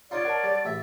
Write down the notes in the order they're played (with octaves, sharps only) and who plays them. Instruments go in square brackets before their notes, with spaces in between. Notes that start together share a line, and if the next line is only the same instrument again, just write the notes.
[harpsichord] C#4 D#4 F4 [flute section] C#5 D5
[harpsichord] A#4 [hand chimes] F#5 A5
[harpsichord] G3 [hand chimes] A6
[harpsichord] A1 E5